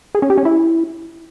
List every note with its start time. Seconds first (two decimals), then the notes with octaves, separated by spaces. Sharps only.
0.15 G#4
0.22 C#4
0.30 G4
0.38 C#4
0.45 E4